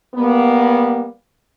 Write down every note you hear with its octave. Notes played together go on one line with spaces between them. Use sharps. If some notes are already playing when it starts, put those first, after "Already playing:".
G3 A#3 B3